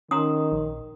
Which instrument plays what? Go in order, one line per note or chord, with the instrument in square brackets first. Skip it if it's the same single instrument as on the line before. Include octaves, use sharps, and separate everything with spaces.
[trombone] D#3 [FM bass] C#4 [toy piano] A#5 C6 D#6
[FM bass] A#1